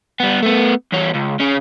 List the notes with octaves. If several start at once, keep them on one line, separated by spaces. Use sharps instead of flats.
G3 B3
A3 B3
E2 C#4
C#2
C#3 C#4